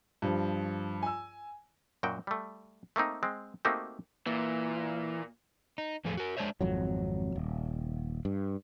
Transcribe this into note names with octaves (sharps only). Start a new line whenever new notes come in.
G2 F3
G#5 E6
F#2 A#2 F#4 G5
G3 A3
A3 A#3 C4 D#4
G#3 C4
A3 A#3 C4 D#4 F#4 G4
A#2 E3
D#4
E2 A2 F3 G#4 A4
F#4 A#4
G#3 D4 C5 C#5 E5
G#1 F2 F#3
D#1
G2